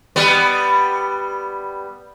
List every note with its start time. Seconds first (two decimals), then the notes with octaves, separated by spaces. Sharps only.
0.16 G3 B3